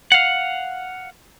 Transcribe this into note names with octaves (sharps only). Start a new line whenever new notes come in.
F5 F#5